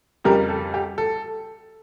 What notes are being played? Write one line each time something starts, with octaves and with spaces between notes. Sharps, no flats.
F2 C#3 G3 G4 A#4
A4
G4
A4